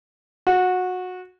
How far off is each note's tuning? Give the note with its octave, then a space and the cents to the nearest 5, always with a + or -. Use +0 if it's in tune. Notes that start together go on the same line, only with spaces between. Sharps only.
F#4 -20